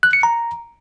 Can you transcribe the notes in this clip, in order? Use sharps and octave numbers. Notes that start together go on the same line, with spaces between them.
F#6
C#7
A#5